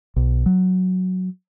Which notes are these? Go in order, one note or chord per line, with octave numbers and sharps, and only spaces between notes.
B1
F#3